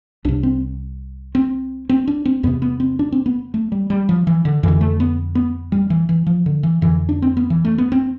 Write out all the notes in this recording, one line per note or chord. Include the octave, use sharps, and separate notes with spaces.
C2 C3 D4
C4
C4
C4
D4
C4
E2 C3 B3
B3
C4
D4
C4
B3
A3
G3
G3
F3
E3
D3
F2 D3 E3
A3
B3
B3
G3
E3
E3
F3
D3
E3
F2 D3 E3
D4
C4
B3
E3
A3
B3
C4